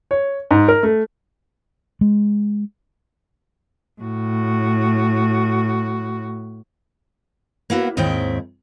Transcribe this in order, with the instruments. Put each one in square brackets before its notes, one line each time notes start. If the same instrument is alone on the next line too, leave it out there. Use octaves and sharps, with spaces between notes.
[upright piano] C#5
G#2
A#4
A3
[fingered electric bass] G#3
[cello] A2 F#4
[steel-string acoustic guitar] A#3 B3 E4 F#4
D#2 G#2 D#3 C4 E4 G5